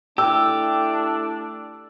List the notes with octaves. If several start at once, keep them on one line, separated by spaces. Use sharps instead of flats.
A3 D4 E4 G4 E6